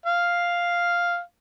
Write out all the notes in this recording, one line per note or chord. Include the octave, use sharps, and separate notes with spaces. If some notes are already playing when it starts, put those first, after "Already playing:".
F5